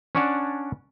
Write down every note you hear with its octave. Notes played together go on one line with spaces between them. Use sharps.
C#4 D4 C#5 D5 F#5 A5